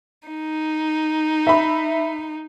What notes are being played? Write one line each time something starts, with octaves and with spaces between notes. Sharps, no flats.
D#4
E5 B5